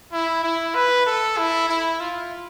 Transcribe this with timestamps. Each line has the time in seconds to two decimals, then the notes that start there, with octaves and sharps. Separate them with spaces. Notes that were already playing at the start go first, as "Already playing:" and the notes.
0.12 E4
0.44 E4
0.75 B4
1.06 A4
1.38 E4
1.69 E4
2.01 F4